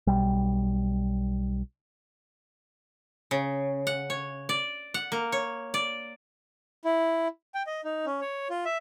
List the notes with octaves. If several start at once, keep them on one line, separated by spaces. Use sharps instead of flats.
B1 G3
C#3
F#5
C#5
D5
F#5
A#3
C#5
D5
E4
G5
D#5
D#4
C#4
C#5
F4
E5